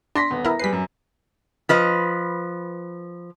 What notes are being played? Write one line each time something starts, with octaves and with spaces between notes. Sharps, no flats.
D4 C6 A#6 B6
D#1 B3
E4 A#4
G3 G#4 B4 B6 C7
F#2
F3 B4 D#5